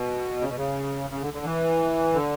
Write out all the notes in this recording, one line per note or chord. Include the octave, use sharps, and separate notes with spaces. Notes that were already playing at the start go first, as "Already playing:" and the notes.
Already playing: B2
C#3
B2
C#3
C#3
D3
D3
E3
D3